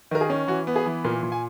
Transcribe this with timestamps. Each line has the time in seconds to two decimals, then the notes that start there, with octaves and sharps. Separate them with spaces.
0.11 D#3 A#4
0.21 G#4
0.30 C#4
0.48 E3 F#4
0.67 B3
0.76 G#4
0.86 E3
1.04 A#2 A#4
1.23 A#2
1.32 G#5